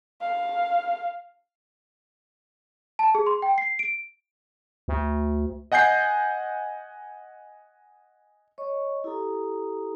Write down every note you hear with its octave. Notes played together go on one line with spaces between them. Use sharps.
F5
A5
G#4
C6
G5
C7
D7
D2
D#5 F#5 G#5 G6 C7
C#5 D#5 C#6
E4 G4 A4 A#5 D#6